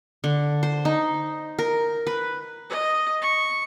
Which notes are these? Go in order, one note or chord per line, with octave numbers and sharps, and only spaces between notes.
D3
C5
D#4
A#4
B4
D#5
C#6